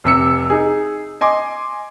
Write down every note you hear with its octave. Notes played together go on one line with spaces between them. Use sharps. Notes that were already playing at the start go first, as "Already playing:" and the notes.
F1 C3 E6 C#7
D#4 G#4
D#5 G#5 C6 D6